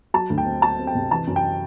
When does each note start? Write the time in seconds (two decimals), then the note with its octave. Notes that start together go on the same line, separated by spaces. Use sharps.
0.14 F#3 A5
0.30 D2
0.38 G5
0.46 C4
0.62 F#3 A5
0.79 C4
0.87 G5
0.95 C3
1.11 E3 A5
1.27 F#2
1.36 G5